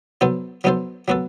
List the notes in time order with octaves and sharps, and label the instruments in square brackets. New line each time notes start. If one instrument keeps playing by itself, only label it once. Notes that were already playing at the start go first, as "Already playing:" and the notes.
[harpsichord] F#3 B3 D#4 A4 C5
F#3 B3 D#4 A4 C5
F#3 B3 F#4 A4